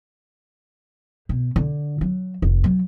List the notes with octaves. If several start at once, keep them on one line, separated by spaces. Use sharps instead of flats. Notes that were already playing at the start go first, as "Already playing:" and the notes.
B2
D3
F#3
F1
F#3